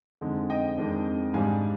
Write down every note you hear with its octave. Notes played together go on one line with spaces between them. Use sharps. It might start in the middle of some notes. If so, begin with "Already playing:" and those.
F2 D3 G#3 D#4
D#5 G5
F2 D#3 G#3 D4
G#2 G3 D4 F5 G#5